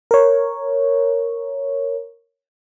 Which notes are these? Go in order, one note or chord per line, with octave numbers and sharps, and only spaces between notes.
A#4 C#5